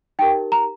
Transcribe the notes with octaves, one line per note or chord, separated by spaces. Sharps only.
D#4 G4 A#4 G5
A#5